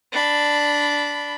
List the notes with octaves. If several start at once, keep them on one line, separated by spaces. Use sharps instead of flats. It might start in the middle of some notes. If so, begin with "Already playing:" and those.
D4 B5